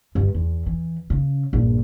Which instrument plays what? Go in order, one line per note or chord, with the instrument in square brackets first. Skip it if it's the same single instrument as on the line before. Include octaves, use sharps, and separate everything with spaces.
[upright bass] G2 D3
E2
E3
C#3
A#1 G2